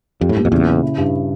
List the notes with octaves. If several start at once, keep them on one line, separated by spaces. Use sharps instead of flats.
F2 G4
A2
G2 A#2
F2
E2 C#3
C#3
E4
G2